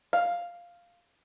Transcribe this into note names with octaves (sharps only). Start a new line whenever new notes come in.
F5